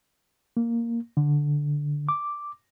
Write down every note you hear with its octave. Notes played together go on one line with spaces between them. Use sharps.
A#3
D3
D6